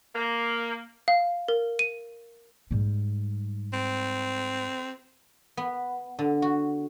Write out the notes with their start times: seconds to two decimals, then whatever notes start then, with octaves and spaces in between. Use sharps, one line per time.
0.16 A#3
1.08 F5
1.48 A#4
1.79 D#7
2.71 G#2 G3
3.73 C4
5.57 B3
6.19 D3
6.42 F#4